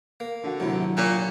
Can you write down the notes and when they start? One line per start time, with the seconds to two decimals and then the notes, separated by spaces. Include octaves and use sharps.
0.20 A#3
0.43 D3 F#4 F#5
0.60 D#2 C3 F#3 E4
0.97 A#2 G3 C#4 G4